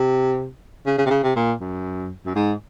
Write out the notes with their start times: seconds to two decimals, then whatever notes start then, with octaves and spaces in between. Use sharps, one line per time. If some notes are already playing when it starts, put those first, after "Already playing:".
Already playing: C3
0.86 C#3
0.98 C#3
1.06 C3
1.10 C#3
1.23 C3
1.36 A#2
1.61 F#2
2.26 F#2
2.36 G#2